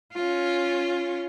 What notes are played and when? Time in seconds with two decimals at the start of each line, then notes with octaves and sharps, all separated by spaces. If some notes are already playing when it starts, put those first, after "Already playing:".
0.13 C#4 F4